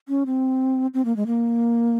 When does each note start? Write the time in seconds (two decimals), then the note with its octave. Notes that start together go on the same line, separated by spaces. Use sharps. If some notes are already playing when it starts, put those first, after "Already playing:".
0.08 C#4
0.26 C4
0.94 C4
1.05 A#3
1.17 G#3
1.27 A#3